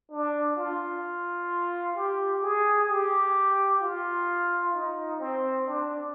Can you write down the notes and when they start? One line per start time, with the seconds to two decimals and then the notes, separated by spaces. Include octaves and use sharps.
0.11 D4
0.57 F4
1.95 G4
2.43 G#4
2.89 G4
3.81 F4
4.74 D#4
5.20 C4
5.66 D4